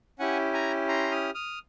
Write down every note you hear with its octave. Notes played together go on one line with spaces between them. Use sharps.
C#4 E4 G4 F#5 G#5
G#5 A#5
A#5 C6
D#6 F6
D#6 F6